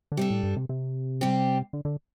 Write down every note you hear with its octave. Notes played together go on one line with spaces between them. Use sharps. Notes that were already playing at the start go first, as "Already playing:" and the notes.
D3
C3 G3 D4 A4
A2
G2
C3
C3
G3 C4 G4
D3
D3